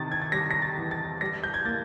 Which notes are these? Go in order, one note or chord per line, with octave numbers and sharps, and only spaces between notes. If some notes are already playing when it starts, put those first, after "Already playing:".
Already playing: C3 D#3 A6
G#6
A6
G3 A#6
A#6
A6
E2
A6
G3 A#6
G6
G#6
A#3 A6